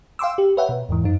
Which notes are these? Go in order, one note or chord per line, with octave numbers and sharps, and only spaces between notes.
F5 G5 C6 D6 E6
G4
B4 C#5 E5 F#5 G5
B2
E2 G#2 E3
F#2 D#4